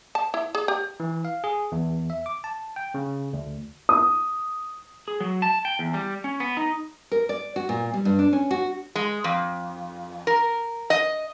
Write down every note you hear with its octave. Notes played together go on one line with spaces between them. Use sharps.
A5
E4
G#4
G4
E3
F5
G#4
E2
E5
D6
A5
G5
C#3
D2
D#6
G#4
F#3
A5
G5
E2
G3
C#4
B3
D#4
A#4
D5
F#4
A#2
G3
G2
D4
C#4
F#4
G#3
F2
A#4
D#5